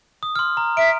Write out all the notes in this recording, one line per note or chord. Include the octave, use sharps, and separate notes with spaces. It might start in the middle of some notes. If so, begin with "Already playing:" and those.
D#6
C6 F6
A#5
E5 D7